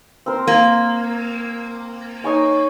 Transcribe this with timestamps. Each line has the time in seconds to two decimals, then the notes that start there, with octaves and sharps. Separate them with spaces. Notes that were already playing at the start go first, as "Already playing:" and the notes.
0.26 C4 A#4 C5
0.47 A#3
2.24 D#4 C#5 G#5